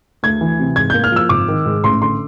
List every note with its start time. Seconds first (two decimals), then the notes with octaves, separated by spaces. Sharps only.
0.23 D2 G#6
0.41 E3
0.59 C3
0.76 G#2 G#6
0.90 A#3 G6
1.04 F6
1.12 F3 E6
1.29 G#1 D6
1.48 D#3
1.66 G#2
1.84 A1 C6
2.02 D3 C6